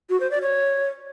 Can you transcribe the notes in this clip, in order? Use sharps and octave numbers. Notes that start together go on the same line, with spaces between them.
F#4
C5
D5
C#5